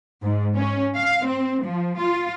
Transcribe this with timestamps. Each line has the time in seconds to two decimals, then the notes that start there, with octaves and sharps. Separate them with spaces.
0.23 G#2
0.56 C#4
0.97 F5
1.26 C4
1.64 F3
2.00 F4